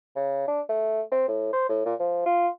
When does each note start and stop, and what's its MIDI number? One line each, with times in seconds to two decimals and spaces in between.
0.16 0.47 49
0.48 0.61 62
0.69 1.02 57
1.12 1.23 60
1.28 1.50 45
1.53 1.65 72
1.69 1.85 45
1.86 1.94 46
2.00 2.24 53
2.26 2.49 65